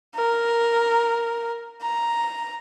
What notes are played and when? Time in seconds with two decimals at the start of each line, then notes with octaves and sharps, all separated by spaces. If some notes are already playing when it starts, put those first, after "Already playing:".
0.15 A#4
1.82 A#5